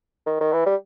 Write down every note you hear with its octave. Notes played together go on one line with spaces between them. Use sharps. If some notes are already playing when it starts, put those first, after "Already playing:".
D#3
D#3
E3
G3